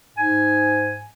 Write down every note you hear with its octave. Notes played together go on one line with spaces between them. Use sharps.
G#2 G#5